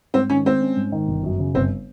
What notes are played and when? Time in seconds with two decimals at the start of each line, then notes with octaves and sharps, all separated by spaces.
0.14 G#2 C4
0.30 D#3 C#4
0.45 G#3 C4
0.61 C#4
0.77 G#2
0.92 D#3
1.08 G1
1.23 F#2
1.39 C#3
1.54 G1 C4